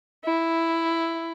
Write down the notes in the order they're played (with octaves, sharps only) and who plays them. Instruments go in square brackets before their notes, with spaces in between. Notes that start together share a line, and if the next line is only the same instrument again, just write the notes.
[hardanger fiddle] E4